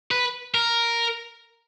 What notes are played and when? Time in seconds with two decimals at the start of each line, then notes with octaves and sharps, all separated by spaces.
0.11 B4
0.55 A#4